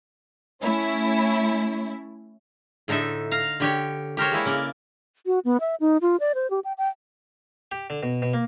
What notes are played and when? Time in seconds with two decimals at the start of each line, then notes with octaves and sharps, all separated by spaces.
0.62 A3 C#4 E4
2.88 A2 D3 D#4 A4 E5
3.31 F5 A#5
3.60 D3 G4 C#5
4.17 G4 A#4 C5 C#5
4.31 G#3 A#3 E4 C#5
4.45 C#3 A#3 D5
5.26 F#4
5.45 B3
5.60 E5
5.80 D#4
6.01 F4
6.20 D5
6.35 C5
6.50 G4
6.64 G5
6.78 G5
7.72 G4
7.90 D3
8.03 B2
8.22 B2
8.34 A#3